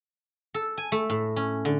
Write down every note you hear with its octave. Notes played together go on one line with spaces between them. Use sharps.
A4
G#5
A3
A2
C#4
D3